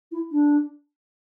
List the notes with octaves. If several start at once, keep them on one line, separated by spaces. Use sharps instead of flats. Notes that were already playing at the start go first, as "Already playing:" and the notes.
E4
D4